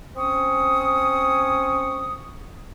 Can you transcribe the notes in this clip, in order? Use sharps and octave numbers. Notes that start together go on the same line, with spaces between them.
C4 C#4 C#6 D#6